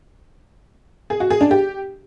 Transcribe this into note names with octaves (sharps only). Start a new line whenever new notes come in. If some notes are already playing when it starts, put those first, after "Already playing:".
G#4
F#4
G#4
D4
G4